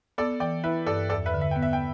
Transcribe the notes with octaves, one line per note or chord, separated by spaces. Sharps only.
B3 A4 D5
E3 D5 G5
E4 B4 E5
G2 A4 D5
E2 A4 D5
B4 E5
D3
E5
B3 G5
E5
G5